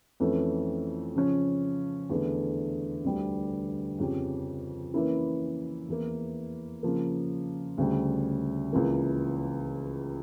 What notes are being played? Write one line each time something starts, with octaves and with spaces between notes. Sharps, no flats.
F2 E3 A3 C#4
C#3 F3 C#4
E2 D3 A3
D2 D3 G3
F2 C#3 F3 C#4 G4
E3 A#3 C#4 E4
E2 E3 A#3
C#3 F3 A#3
D2 C#3 G3
C#2 C#3 E3 A#3